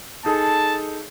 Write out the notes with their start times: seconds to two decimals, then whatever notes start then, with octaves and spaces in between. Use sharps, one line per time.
0.25 D#4 G#4 A4 A5